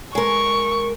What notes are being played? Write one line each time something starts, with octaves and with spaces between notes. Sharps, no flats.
G#3 A#4 C#6